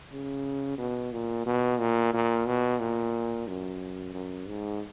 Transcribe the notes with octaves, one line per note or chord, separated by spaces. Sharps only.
C#3
B2
A#2
B2
A#2
A#2
B2
A#2
F#2
F#2
G#2